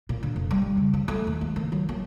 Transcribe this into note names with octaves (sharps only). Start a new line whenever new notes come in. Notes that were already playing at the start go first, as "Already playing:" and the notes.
A#2
D3
F1
G3
C#3
G3
A3
D#2
G#3
D#3
F#3
A#3